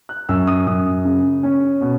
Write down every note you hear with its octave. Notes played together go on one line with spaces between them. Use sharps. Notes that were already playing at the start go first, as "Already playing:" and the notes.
F#6
F#2 E6
D#6
F#2 D#6
C#3
C#4
B2